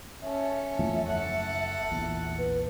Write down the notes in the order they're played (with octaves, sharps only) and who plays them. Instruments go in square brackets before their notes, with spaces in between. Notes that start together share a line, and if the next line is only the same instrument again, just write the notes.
[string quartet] C#4 A4 [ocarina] E5
[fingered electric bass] E2 F3 A3
[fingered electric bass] F#1 [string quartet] A4 F#5
[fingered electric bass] A#1 E2
[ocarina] B4